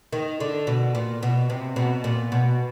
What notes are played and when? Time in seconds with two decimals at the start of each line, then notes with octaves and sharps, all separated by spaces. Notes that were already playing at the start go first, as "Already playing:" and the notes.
0.13 D#3
0.40 D3
0.67 B2
0.95 A#2
1.23 B2
1.50 C3
1.76 B2
2.04 A#2
2.32 B2